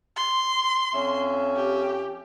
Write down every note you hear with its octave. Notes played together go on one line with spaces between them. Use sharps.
C6
F2 C#4 E5
G4